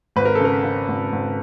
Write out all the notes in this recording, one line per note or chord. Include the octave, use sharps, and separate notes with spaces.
G#1 B4
A#4
A4
C#3 A#4
C#3
G#1
G#1